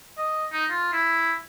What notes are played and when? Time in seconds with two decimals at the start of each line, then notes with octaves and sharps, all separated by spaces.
0.18 D#5
0.52 D#4
0.70 F4
0.93 E4